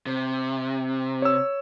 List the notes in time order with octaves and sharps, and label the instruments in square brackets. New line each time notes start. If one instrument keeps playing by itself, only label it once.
[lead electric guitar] C3
[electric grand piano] C#5 E6